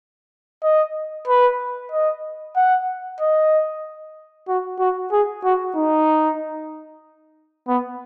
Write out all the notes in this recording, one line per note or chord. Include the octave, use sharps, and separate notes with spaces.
D#5
B4
D#5
F#5
D#5
F#4
F#4
G#4
F#4
D#4
B3